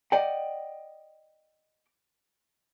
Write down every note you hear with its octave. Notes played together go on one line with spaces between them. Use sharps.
D5 D#5 F#5 G5